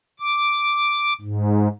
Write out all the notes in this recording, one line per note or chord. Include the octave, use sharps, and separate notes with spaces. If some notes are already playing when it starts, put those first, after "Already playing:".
D6
G#2